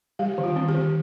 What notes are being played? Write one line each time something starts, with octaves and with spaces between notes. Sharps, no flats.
G3 G4
D#3
F4
C4
G4
D#3